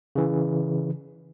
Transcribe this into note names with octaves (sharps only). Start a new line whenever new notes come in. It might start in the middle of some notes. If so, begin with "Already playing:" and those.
C#3 E3